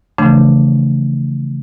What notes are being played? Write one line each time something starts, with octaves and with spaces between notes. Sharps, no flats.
C#3 E3 F3 A3 D4